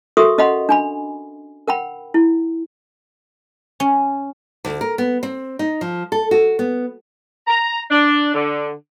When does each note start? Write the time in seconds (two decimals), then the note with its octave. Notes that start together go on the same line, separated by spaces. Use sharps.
0.17 F#4 A4 A#4 E5 C#6 D#6
0.38 C#4 D#5 F5 F#5 B5 C6
0.69 D4 G#5 B5
1.67 A#4 F#5 G5 B5
2.14 E4
3.80 C#4
4.65 D2
4.81 A#4
4.98 B3
5.23 C4
5.59 D#4
5.81 F3
6.12 A4
6.31 F#4
6.59 B3
7.47 A#5
7.91 D4
8.34 D3